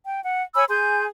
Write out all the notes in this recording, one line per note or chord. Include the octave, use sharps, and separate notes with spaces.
G5
F#5
C#5 G#5 B5 E6
G#4 G#5 C6 G6